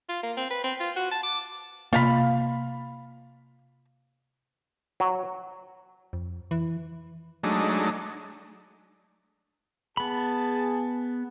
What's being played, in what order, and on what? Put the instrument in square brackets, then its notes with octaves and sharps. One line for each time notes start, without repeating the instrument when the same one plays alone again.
[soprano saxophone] F4
A#3
C4
B4
C4
F4
F#4
A5
D6
[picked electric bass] C3 A#3 [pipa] F4 F5 B5
[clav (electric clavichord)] F#3
[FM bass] F2
E3
[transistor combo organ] F#3 G#3 A3 D4 D#4
[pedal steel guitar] B3 B5 [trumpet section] G#4 A5